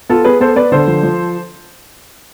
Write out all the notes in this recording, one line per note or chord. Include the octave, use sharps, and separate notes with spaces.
B3 F4 A4
B3 G#4 B4
B3 A4 C5
B3 B4 D5
D3 A4 C5
F3
F3